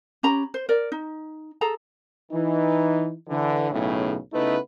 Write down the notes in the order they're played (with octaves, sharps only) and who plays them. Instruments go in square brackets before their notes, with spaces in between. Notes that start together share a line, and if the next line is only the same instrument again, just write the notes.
[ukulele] C#4 G4 A#5 B5
C5
A#4 D5
D#4
G#4 A4 A#5
[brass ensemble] E3 D#4
D3 E3
B1 A2 C#3
C#3 A3 B3 D#4 E4 B4